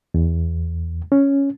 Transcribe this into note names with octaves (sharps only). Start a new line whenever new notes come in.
E2
C#4